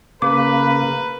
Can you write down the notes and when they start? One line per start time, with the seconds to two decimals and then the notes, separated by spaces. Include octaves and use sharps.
0.22 C#3 A#3 A#4 B4 D6